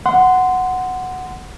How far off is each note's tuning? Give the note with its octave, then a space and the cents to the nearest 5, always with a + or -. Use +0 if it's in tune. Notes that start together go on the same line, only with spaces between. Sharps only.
F#5 +0 C6 -20